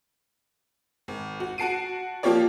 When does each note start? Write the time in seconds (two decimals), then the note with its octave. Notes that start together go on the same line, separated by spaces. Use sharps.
1.08 G#1
1.40 F#4
1.58 F#4 F#5 A5 C7 D7 D#7
2.23 F3 A#3 F4 G4 C#5 D5